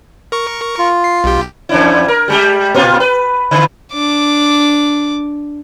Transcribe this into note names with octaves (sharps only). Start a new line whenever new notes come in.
A#4 C#6
F4
C7
B1 G4
E2 D4 E4
A#4
G3 G#3 G4
A#2 C4 F4
B4
D3 E3
D4 D6